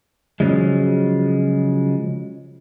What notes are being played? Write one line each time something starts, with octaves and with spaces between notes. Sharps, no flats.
C#3 F3 F#3 G#3